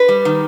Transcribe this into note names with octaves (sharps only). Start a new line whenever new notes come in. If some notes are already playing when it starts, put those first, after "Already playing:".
Already playing: B4
G3
D#3